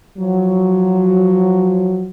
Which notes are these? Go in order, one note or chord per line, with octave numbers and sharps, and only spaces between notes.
F3 F#3